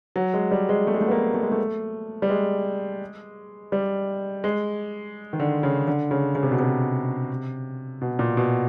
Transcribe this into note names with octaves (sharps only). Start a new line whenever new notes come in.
F#3
G#3
G3
G#3
A3
G#3
A3
B3
A#3
A3
G#3
A3
G3
G#3
G3
G#3
D#3
D3
C#3
D3
C#3
C#3
C3
B2
C3
B2
A#2
B2